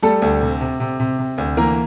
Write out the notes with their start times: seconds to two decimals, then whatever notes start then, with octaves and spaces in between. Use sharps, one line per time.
0.03 G3 A3 A4
0.22 D2
0.42 C3
0.61 C3
0.80 C3
1.00 C3
1.19 C3
1.38 D2
1.57 E3 A#3 A#4